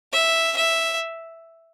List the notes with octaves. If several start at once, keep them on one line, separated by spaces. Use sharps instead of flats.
E5
E5